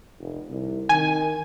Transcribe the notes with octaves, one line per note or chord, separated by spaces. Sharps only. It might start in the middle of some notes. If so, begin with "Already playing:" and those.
F1
C2
D#3 G#5